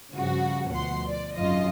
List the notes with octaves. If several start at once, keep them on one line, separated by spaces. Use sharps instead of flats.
G2 C#3 F3 F#4
D2 B2 F3 F#5 C6
D5
G#1 F#2 F4 D#5